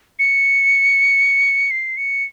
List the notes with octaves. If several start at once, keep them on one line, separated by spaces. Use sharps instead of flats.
C#7
C7
C#7